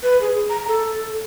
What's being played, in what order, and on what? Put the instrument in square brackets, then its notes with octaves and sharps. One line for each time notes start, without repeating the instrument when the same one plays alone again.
[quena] B4
G#4
A#5
A4